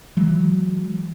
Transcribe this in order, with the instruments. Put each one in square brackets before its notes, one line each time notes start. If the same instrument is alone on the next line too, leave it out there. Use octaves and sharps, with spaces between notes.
[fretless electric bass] E3 F#3 G#3